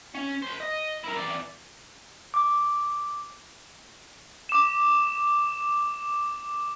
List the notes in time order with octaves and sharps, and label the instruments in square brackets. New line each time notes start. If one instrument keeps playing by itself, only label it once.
[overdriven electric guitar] C#4
C5 B5
D#5
E4 A#4
E3 D5
[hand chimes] D6
[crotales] D6 E7